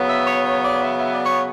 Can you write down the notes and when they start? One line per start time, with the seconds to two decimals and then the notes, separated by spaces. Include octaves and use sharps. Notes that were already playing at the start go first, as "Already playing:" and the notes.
Already playing: C#3 F#3 B3
0.09 E5
0.27 C#5
0.45 C#5
0.62 D5
0.81 E5
0.98 E5
1.11 D5
1.26 C#5